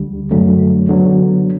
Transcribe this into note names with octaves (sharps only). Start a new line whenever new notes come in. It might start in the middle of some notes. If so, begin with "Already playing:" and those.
Already playing: D2 D3 G3
F#2 D3 F#3 A3
D3 F#3 B3